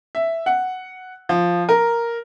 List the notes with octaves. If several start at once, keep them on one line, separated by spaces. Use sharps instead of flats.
E5
F#5
F3
A#4